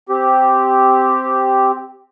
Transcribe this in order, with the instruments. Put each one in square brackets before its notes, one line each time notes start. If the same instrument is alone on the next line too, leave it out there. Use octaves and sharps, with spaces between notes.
[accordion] C4 G4